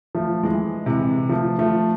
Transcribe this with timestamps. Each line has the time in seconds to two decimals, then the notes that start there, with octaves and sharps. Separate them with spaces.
0.15 F3 A3
0.43 E3 G#3
0.86 C3 E3
1.29 F3 A3
1.59 F3 A3